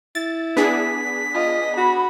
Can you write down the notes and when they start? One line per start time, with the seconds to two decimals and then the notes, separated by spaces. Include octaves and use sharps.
0.15 E4 A6
0.57 B3 D4 G#4 B6
1.35 F4 D#5
1.77 F#4 B5